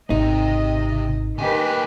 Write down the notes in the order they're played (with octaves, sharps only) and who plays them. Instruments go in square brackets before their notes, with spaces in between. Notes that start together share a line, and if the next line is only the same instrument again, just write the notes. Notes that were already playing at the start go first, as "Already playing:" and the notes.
[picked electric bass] G#1 [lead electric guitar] C3 [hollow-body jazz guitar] D#4 [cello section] D#5
[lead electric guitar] D#2 G#5 [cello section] D#3 G4 B4